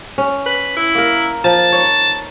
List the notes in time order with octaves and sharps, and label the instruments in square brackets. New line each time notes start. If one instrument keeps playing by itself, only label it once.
[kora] C#4
[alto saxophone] B4
E4
[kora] A#3 A#4
[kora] F3 [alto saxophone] A5
[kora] D#4 C#5